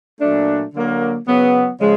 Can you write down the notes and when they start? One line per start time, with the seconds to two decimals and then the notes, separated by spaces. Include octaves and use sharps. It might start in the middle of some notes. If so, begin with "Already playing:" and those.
0.21 A#2 F#3 A3 D4
0.74 D3 F#3 A#3
1.26 C#3 F#3 B3
1.79 C#3 F3 G#3